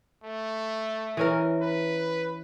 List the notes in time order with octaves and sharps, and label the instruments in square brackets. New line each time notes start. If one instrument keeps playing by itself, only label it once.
[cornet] A3
[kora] E3 C#4 A#4
[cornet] B4